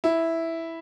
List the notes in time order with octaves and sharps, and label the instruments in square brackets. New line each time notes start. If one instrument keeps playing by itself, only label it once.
[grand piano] E4